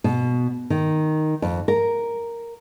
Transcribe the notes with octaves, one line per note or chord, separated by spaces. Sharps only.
B2
D#3
F2
A#4